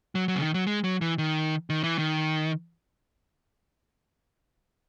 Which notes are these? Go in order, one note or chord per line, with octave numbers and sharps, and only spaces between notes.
F#3
F#3
C#3
D#3
F#3
G#3
F#3
E3
D#3
D#3
E3
D#3